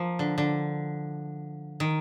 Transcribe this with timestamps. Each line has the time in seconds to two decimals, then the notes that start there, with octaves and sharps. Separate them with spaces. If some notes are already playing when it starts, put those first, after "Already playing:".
Already playing: F3 A#3
0.19 D3
0.38 D3
1.80 D#3